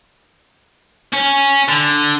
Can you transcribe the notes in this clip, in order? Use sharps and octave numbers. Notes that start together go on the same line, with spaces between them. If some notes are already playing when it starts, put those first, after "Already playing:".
C#4
D3